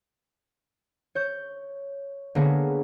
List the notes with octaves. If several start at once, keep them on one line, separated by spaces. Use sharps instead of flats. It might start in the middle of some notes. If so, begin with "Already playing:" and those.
C#5 G6
D3 A#3 B3 G#4 C#5